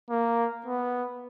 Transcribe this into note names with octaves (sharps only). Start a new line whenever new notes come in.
A#3
B3